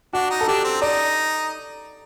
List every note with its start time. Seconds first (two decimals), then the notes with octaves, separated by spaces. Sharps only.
0.13 D4 F#4
0.30 D#4
0.41 A4
0.48 D4 G4
0.64 C4
0.81 D#4 D5